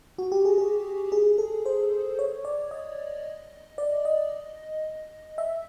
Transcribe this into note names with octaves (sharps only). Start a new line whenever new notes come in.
F#4
G4
G#4
G#4
G#4
A4
C5
C#5
D5
D#5
D5
D#5
E5